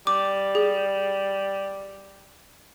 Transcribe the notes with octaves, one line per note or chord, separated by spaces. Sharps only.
G3 D6
G#4